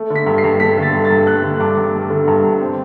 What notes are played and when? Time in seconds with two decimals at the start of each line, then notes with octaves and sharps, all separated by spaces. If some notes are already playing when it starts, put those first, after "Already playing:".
Already playing: A3
0.10 D3
0.15 B6
0.26 G2
0.38 C7
0.44 G2
0.60 A3 B6
0.78 D3 A6
0.94 G2
1.05 A6
1.10 G2
1.27 A3 F#6
1.43 D3
1.60 G2 D6
1.77 G2
1.94 A3
2.10 D3
2.27 G2
2.44 G2
2.61 C4